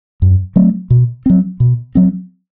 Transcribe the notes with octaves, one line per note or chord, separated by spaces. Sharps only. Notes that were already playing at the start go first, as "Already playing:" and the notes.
F#2
F#3 A3 C4
B2
F#3 C4
B2
F#3 C4